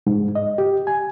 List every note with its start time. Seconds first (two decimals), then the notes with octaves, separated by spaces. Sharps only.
0.07 G#2
0.35 D#5
0.58 G4
0.87 G#5